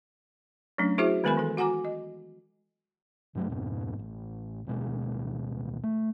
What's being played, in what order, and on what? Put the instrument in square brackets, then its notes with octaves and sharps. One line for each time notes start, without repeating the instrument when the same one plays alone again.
[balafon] F#3 A3 C#4 D4
E4 F#4 G#4 C5 E5
D#3 G#3 B3 A#4 G#5 B5
E3 A4
F#4 F#5 G#5 A#5 D6
D#5
[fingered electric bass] G2 F#3 A3
F2 G#2 B2
A1
D1 B2 G#3
A3